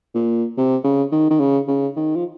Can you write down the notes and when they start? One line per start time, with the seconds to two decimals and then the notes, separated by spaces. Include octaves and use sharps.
0.14 A#2
0.57 C3
0.84 C#3
1.12 D#3
1.30 D#3
1.40 C#3
1.68 C#3
1.96 D#3
2.15 F3